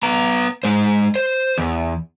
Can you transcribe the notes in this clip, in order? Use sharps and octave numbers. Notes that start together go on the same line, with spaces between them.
B3 A#5
G#3 C5
C5
E2